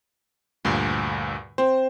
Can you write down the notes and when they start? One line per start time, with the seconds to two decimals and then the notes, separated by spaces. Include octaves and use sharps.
0.65 D2 G2 A#2 C6 C#6
1.58 C4 C5